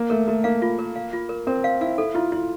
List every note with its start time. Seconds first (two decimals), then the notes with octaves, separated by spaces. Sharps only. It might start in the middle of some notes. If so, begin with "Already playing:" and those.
Already playing: A#3
0.10 A3 A#4
0.28 A3 A#4
0.44 A#3 F5
0.62 F4
0.79 A#4
0.96 F5
1.13 F4
1.29 A#4
1.47 C4 A#4
1.64 F5
1.81 E4 F5
1.98 E4 A4
2.15 E4 F4
2.32 E4 F4